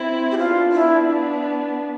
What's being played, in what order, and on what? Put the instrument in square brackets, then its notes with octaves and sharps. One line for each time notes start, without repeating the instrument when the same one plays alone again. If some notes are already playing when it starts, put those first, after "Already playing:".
Already playing: [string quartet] C4 E4
[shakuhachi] G4
[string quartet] B3 D4 [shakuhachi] F4
[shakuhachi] E4